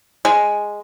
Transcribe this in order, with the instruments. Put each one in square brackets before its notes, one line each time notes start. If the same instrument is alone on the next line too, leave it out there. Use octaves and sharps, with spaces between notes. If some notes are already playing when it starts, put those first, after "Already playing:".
[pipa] G#3